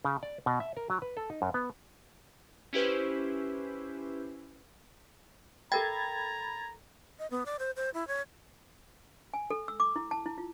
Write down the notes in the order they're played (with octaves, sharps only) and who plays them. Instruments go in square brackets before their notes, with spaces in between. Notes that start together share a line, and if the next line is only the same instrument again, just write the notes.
[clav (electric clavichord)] C#3
D5
B2
E5
A#4
F#3
B4
A4
D#4
F#2
B3
[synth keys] C#4 E4 G4 B4 C5
[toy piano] A4 A#4 E5 [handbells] G5 [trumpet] A#5 [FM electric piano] B5 G#6 A6
[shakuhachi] D#5
B3
D5
C5
C5
E4
C#5
[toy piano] G#5
A4
E6
D6
E4
A5
E4
F4